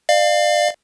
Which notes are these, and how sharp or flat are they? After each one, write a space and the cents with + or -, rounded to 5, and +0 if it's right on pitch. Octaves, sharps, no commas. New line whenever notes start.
D5 +35 F5 +0